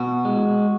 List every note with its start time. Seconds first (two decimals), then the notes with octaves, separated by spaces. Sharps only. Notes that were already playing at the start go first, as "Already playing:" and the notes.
Already playing: B2 F#4
0.25 G#3